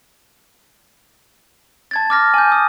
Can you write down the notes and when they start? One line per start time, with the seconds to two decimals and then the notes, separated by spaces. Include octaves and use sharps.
1.91 A5 G#6 A6
2.10 D6 F6 A#6
2.34 G#5 G6
2.52 D#6